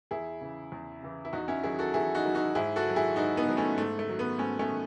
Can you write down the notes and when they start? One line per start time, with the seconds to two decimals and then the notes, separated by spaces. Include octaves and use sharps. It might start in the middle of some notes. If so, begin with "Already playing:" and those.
0.11 E2 E4 G#4
0.41 C#3 E3
0.72 E2
1.02 C#3 E3
1.25 E4
1.33 E2 D#4 F#4
1.48 C#4 E4
1.63 D#3 F#3 E4 G#4
1.79 F#4 A4
1.94 E2 E4 G#4
2.15 D#4 F#4
2.25 D#3 F#3
2.35 D#4 F#4
2.55 G#2 E4 G#4
2.76 F#4 A4
2.86 D#3 F#3
2.96 E4 G#4
3.16 G#2 D#4 F#4
3.37 B3 D#4
3.48 D#3 F#3
3.57 A3 C#4
3.78 G#2 A3
3.99 A3
4.08 D#3 F#3
4.19 B3
4.39 G#2 A3 C#4
4.59 A3 C#4
4.70 D#3